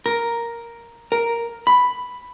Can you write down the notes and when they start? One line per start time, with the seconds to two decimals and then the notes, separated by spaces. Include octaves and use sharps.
0.06 A#4
1.12 A#4
1.67 B5